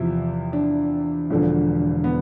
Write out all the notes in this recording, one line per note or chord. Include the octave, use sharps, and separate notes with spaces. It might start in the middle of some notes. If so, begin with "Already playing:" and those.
Already playing: E2 C3 F3 E4
D4
E1 E2 D3 F3
B3